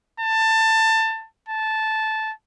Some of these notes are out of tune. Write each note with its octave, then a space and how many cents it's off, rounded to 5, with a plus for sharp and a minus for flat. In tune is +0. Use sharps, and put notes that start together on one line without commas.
A5 +20
A5 -10